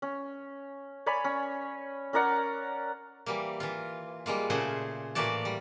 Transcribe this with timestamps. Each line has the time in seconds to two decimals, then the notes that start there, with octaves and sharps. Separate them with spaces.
0.02 C#4
1.06 C#5 D5 G#5 B5
1.24 C#4
2.13 C#4 A#4 D5 F#5
3.26 E3 G3 A#3
3.60 E3 F4
4.26 G3 G#3 A#3 F4
4.50 A#2 C#3 A3 G#4 C5 F#5
5.15 A2 E3 A#3 F#4 D5 A5
5.45 G3